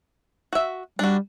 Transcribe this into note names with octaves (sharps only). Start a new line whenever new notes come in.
F#4 E5
G3 D4 F#4